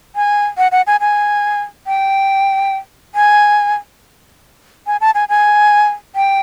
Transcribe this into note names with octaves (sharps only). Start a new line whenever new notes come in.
G#5
F#5
F#5
G#5
G#5
G5
G#5
G#5
A5
G#5
G#5
G5